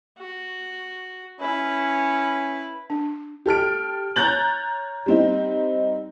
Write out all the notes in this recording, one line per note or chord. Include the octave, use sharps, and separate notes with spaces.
F#4
C#4 E4 B4
D4
G4 A4 F6 D7
C#5 A#5 F#6 G6 A6 F#7
G3 C4 D#4